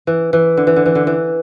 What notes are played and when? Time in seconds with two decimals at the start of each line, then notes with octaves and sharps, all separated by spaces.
0.07 E3
0.33 E3
0.57 D3
0.67 E3
0.76 D3
0.86 E3
0.95 D3
1.07 E3